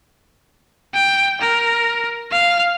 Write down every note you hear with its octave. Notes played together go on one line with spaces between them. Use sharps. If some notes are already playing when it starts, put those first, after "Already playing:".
G5
A#4
F5